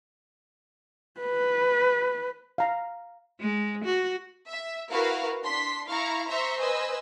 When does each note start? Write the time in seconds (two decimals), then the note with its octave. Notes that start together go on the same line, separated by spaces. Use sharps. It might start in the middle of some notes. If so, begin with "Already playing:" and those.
1.20 B4
2.58 F5 A#5
3.41 G#3
3.85 F#4
4.47 E5
4.91 E4 F#4 A#4 B4 F5
5.43 D4 C6 B6
5.87 E4 F5 A#5 C#6
6.27 C5 E5 A#5 C6 C#6
6.60 B4 C5 D#5 G#5 E6